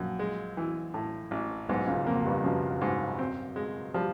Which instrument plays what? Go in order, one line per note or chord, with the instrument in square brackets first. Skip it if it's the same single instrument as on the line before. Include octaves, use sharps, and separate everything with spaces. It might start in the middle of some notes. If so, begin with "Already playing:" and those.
Already playing: [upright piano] A#1 A#2 [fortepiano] F#2
[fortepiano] G#3
E3
A2
A1
[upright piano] B1 B2 [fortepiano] G#2
[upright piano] C#2 C#3
[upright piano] F2 F3 [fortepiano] A#3
[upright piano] G2 G3
[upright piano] F#2 F#3 [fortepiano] F3
[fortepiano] G#2
C4
G#3
[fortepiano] F3 [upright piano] G3